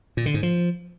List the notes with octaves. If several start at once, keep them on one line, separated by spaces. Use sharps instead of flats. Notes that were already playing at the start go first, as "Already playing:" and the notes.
A#2
D3
G#2
F3